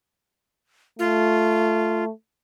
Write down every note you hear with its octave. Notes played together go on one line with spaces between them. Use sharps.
A3 F4